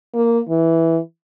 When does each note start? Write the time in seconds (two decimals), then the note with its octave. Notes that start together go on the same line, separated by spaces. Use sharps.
0.14 A#3
0.49 E3